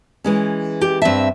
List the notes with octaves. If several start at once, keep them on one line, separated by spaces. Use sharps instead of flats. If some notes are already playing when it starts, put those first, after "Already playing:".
E3 G#3 C#4
G4
G2 C4 E5 A5